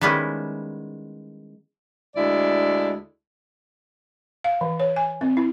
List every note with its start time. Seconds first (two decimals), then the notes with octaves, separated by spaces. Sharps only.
0.01 D#3 G3 G#3 B3 C#4 E4
2.16 D2 G#3 E4 D5
4.44 F5
4.61 E3
4.80 C#5
4.96 G#5
5.21 C4
5.37 E4